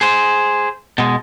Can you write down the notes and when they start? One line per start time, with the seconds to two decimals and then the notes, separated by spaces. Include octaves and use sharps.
0.01 G#4 C5
0.98 B2 G#3